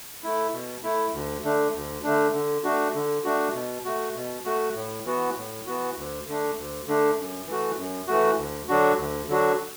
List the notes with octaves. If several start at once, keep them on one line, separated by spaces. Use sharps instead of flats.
A3 E4
B2
A3 E4
D2
D3 A3 D4
D2
D3 A3 D4
D3
A3 D4 F#4
D3
A3 D4 F#4
B2
A3 F#4
B2
A3 F#4
A2
E3 B3 F#4
A2
E3 B3 F#4
D2
D3 A3 D4
D2
D3 A3 D4
F#2
E3 A3 F#4
F#2
E3 A3 F#4
D2
D3 F#3 D4 F#4
D2
D3 F#3 D4 F#4